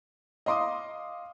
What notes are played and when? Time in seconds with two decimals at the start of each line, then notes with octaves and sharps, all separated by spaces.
0.46 D#5 F5 C6 D6 D#6